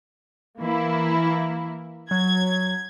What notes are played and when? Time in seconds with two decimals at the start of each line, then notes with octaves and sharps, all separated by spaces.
0.60 E3 A#3 E4
2.11 F#3 G#6